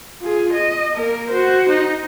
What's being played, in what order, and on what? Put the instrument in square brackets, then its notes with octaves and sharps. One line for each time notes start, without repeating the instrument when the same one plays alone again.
[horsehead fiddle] F4 G#4
D#5
A#3 A#4
F#4 C5
D#4